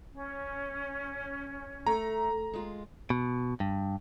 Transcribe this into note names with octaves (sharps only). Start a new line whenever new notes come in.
C#4
A3 A#5
G#3 F4
B2
G2